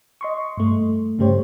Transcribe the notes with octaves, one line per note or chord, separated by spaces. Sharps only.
D#5 C6 C#6
G2 A3
G2 C#3 A3 G4 C5 C#5